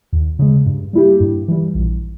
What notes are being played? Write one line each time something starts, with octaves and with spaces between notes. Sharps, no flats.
D#2
C#3 G#3
G2
G3 A#3 E4 G4
G2
E3 G3
A#1